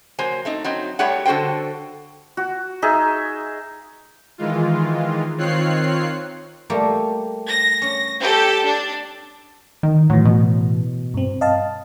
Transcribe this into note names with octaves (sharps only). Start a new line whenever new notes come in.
F#3 A#3 C5 G#5
A3 C4 D#4
F#3 C4 D#4
F#3 G3 A3 G4 C#5 F#5
D3 F#4 A4 C5 G5
F#4
D#4 G#4 E5
D#3 E3 G#3 F4
D#3 C4 F4 C#5 F#6 C7
G3 A3 A#3
A#6
C#4
G4 A4
D4
D#3
A2 E3 F#3
B2
G2 C4
D#5 F5 A5